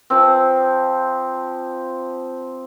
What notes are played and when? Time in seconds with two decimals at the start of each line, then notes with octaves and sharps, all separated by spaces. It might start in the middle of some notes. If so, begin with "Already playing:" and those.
0.10 F3 C4